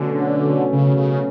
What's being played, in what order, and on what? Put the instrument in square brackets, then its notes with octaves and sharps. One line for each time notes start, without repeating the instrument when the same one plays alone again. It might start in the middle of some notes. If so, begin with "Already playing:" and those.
Already playing: [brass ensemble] B2 F#3 A3 C#4 [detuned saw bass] D3
[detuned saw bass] C#3
C#3